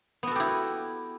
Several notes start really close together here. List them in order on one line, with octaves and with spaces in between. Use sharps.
B3 F#4 A4 G4 E4